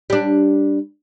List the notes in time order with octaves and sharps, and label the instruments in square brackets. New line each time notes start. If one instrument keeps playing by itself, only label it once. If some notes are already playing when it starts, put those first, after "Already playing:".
[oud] G3 D4